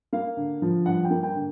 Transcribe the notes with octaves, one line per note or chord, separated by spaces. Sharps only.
A#3 F5
D3
F3
G2 F#5
G5
A#3
G5
D3